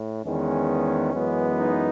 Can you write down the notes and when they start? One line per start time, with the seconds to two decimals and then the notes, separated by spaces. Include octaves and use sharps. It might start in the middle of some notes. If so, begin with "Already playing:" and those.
Already playing: A2
0.24 E2 D#3 G#3 B3 C#4
1.13 F#2 E3 G#3 B3
1.58 D#4